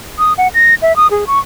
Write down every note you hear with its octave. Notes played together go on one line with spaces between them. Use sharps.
D#6
F#5
A#6
E5
D#6
G#4
C#6